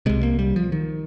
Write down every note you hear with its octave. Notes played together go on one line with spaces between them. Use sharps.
C2 C3 G#3
A#3
G3
F3
D#3